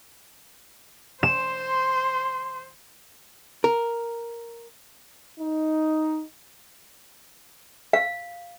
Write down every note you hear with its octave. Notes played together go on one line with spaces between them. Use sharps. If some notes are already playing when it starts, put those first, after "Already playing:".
C5 C6 E7
A#4
D#4
F5